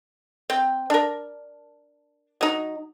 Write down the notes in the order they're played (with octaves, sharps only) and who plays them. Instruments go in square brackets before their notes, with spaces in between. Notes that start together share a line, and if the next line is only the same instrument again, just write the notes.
[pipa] C4 G5
D4 A#4
F#3 D#4